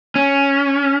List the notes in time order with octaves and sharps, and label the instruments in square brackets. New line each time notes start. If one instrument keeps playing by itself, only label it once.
[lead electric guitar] C#4